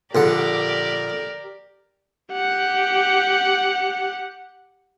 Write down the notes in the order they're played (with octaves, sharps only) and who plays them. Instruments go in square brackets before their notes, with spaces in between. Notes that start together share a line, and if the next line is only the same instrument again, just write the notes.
[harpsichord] A#1 D3 F#5 [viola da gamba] G4 A#4 D5
[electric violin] G4 F#5